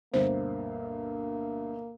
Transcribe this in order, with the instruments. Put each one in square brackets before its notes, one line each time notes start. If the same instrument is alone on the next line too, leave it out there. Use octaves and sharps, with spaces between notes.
[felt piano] D2 G2 B2 [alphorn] A#3 [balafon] C5